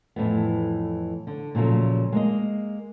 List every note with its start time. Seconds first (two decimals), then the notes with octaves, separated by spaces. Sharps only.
0.16 F2 A2 E3 B3
1.27 D3
1.55 A#2 C#3 F3 F#3 A3
2.12 G#3 A#3 D#5